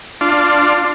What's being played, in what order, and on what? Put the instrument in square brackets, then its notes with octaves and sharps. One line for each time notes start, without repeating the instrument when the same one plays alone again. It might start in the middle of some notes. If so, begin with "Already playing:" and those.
[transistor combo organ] D4 F4